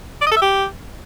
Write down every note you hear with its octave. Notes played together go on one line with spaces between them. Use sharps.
D5
D#5
A4
E5
G4